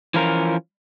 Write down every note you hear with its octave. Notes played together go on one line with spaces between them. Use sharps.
E3 F3 C#4 F4 A#4